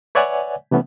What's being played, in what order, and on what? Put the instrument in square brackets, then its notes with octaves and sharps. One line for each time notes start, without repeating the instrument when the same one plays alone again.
[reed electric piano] B4 C#5 D5 E5 F#5 G#5
C3 E3 A3 B3 C#4